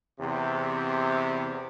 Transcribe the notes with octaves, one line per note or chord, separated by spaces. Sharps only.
E2 C3